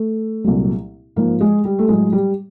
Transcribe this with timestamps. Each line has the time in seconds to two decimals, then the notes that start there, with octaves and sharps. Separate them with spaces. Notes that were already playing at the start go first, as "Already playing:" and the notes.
Already playing: A3
0.44 C2 A#2 F#3
1.16 G#2 F3 A#3
1.41 G#3
1.65 G3
1.79 A3
1.89 A2 F#3 G#3
2.12 G3